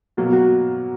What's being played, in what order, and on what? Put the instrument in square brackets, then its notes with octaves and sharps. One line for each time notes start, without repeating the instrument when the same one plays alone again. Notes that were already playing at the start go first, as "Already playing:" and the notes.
[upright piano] B2 F#3 A#3
[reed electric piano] F#4